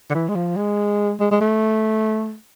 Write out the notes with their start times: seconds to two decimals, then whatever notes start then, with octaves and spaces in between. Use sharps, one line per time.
0.10 D3
0.14 E3
0.29 G#3
0.35 F3
0.56 G#3
1.20 G#3
1.31 G#3
1.41 A3